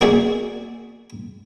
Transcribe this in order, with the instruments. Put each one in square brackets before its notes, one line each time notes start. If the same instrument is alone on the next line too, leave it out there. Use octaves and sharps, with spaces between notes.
[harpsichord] A#3 F#4 G#4 D5 E5 F#5